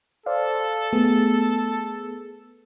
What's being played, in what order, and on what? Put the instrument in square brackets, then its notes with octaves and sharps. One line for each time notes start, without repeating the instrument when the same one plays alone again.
[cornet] A4 [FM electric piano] C5 D5 F5
[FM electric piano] A3 B3 G#4